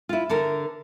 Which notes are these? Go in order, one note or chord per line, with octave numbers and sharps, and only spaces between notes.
E4 F4
D3 A4 A#4